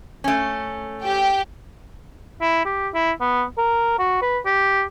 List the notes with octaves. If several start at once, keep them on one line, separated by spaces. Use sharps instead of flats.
A3 C#4
G4 G5
E4
G4
E4
B3
A#4
F#4
B4
G4